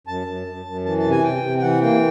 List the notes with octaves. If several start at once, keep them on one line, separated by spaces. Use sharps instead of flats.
F#2 A5
F#2
F#2
F#2
E3 A5
A5
C3
G#5
C3 G5
C3
G5
E3 F#5
A#3 G5